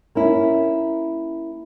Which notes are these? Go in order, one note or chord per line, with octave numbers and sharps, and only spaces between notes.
A#3 C#4 E4